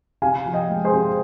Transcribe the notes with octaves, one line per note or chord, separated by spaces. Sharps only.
C3 F5 G#5
F3
D#5 G5
G#3
G#4 C5
C3